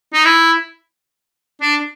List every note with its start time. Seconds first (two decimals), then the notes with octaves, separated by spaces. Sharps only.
0.13 D#4
0.25 E4
1.61 D4